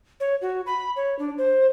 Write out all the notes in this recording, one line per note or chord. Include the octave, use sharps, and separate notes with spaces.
C#5
F#4
B5
C#5
D4
C5